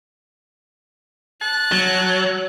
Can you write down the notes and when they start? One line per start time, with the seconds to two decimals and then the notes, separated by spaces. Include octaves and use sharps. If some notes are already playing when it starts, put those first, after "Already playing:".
1.42 A5 F#6
1.72 F#3